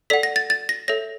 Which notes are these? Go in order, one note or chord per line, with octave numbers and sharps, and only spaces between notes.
A4 D5 F#5 B6
A#6
A6
A6
A#6
A4 C#5 E5 A#6